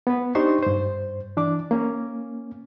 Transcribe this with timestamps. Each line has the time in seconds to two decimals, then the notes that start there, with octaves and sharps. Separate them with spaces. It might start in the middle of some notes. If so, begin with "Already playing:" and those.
0.07 B3 B4
0.35 D4 D#4 G4 C5 C6 C#6
0.63 G2 C5
1.37 E3 D4 D6
1.71 A#3 C#4